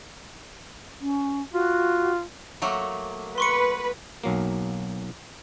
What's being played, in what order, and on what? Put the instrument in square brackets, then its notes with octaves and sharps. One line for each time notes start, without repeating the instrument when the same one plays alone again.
[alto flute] C#4
[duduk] F4 [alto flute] F#4
[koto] F#3 A3 A#3
[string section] B4 [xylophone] C6 C#6 C#7
[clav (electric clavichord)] B1 F#3 A#3